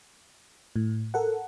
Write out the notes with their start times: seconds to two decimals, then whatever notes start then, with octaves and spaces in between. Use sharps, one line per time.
0.76 A2
1.14 A4 A#4 F#5